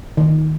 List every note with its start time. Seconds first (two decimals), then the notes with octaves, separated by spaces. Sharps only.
0.17 D#3